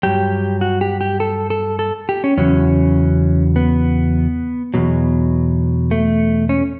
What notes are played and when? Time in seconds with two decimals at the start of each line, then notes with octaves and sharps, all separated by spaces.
0.03 G2 F#3 G4
0.61 F#4
0.81 G4
1.01 G4
1.20 A4
1.50 A4
1.79 A4
2.09 G4
2.24 C#4
2.37 E2 C#3 F#3 C#4
3.56 B3
4.74 E2 B2 F#3
5.91 A3
6.49 C#4